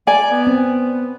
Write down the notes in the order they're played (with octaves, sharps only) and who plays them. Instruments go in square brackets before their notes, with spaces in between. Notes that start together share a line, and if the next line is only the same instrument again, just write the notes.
[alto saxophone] D5 [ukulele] G#5
[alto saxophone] B3
[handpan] C4